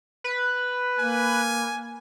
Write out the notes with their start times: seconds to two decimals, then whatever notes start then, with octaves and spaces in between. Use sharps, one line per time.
0.24 B4
0.99 A#3 G#5